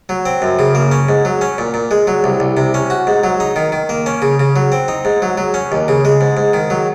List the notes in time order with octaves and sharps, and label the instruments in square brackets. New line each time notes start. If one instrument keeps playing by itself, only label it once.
[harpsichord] F#3
C4
F#2
C#3
A#3
C#4
G#2
F#3
C#4
A#2
A#2
G#3
F#3
C2
C2
C3
C#4
F#4
G#2
F#3
D#4
D#3
D#3
A#3
C#4
C#3
C#3
F#3
C4
D#4
G#2
F#3
F#3
C#4
D#2
C#3
G#3
G#2
G#2
D#3
F#3